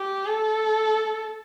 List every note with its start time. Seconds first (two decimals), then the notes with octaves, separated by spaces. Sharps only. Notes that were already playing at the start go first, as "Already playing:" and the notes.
Already playing: G4
0.25 A4